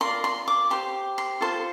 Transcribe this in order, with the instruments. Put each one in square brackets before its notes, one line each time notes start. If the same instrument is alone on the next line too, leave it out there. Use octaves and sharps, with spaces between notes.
[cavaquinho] F4 A#4 D5 C6
C6
D6
G4 C5 C6
C6
F4 A4 C5 C6